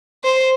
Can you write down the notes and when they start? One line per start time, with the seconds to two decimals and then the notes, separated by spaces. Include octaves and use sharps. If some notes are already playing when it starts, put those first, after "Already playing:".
0.24 C5